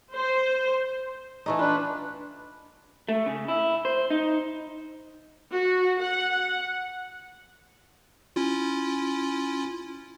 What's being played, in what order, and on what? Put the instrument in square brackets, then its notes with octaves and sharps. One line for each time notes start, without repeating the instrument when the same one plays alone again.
[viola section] C5
[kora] E3 A3 D#4
[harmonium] D4 B4 [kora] F4
[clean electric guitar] A3
C#3
E4
C5
D#4
[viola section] F#4
F#5
[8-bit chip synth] C#4 E4 F4